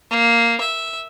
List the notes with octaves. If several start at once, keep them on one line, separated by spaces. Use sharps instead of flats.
A#3
E5